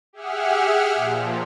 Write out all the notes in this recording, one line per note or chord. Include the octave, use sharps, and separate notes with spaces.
G4 G#4 E5 F#5 F6
A#2 F3